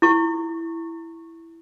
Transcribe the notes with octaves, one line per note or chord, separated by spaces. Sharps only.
E4 C#6